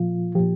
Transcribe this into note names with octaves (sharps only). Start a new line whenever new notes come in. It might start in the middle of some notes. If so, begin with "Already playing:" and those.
Already playing: A#2 F3 F4
A#2 F3 G4